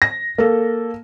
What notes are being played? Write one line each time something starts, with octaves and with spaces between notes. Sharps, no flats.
A#6
A#3 A4